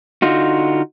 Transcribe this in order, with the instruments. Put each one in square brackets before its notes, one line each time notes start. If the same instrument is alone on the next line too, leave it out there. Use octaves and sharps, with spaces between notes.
[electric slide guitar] D3 D#4 F4 F#4